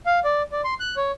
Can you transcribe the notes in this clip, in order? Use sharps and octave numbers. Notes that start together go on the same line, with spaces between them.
F5
D5
D5
C6
F#6
C#5